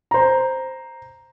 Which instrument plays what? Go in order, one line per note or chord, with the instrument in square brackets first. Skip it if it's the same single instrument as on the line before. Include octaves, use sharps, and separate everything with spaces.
[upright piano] C5 A#5